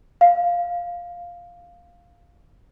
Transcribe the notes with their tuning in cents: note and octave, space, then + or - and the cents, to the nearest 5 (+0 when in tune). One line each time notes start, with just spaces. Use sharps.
F5 +5